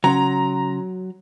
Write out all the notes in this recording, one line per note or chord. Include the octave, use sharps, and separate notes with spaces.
C#3 F#3 C#4 A#5 C6